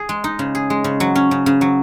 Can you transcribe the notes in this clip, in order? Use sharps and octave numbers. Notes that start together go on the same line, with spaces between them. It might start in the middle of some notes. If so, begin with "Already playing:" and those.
Already playing: G#4
G#3
D#4
C#3
G#4
G#3
C#3
F#3
C#4
C#3
C#3
F#3